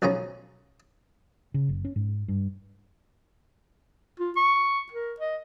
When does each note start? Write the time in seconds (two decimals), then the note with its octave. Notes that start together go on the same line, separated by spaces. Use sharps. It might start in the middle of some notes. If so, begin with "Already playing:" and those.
0.02 B1 F3 C#4 G#4 A#5
1.54 C#3
1.69 F#1
1.85 C#4
1.96 G#2
2.28 G2
4.20 F4
4.37 C#6
4.92 A#4
5.20 D#5